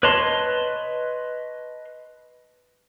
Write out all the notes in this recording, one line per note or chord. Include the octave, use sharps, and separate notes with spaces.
B4 C#5 D#5 A5 C6